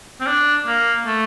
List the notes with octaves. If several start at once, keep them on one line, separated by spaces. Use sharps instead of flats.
C4
D4
A#3
A3